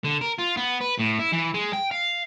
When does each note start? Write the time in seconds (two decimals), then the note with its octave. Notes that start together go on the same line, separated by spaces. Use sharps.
0.04 D3
0.21 A#4
0.38 F4
0.57 B3
0.81 B4
1.00 A2
1.19 E4
1.33 E3
1.54 G#3
1.73 G5
1.91 F5